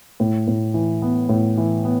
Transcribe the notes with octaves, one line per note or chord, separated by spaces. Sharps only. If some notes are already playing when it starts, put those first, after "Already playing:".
A2
A2
E3
B3
A2
E3
B3